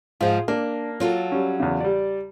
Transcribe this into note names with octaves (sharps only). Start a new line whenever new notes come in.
G#2 F3 F4 G#4
A#3 D4
F#3 F4 A4
G3 C#4
E2 C#3
G3 D5